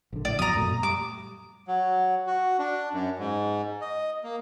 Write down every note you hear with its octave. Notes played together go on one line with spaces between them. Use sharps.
A#1 D3
A2 D5
F2 B2 F#3 A#5 D#6
F#2 A#2 A3
G3 D6
F#3
F#4
D4
F#2
G#2
D#5
A#3